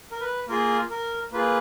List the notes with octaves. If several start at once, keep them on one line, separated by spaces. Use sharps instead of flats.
A#4
B4
A#3 F4 G#4 A#4
A#4
A#3 F4 G#4 B4